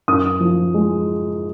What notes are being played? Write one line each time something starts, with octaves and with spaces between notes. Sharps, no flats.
F#2 D#6
F3
G#3